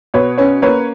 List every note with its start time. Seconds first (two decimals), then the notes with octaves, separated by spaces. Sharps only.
0.14 B2 B4 C#5
0.38 C#4 B4 C#5
0.62 A#3 B4 C#5